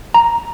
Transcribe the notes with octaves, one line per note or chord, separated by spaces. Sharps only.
A#5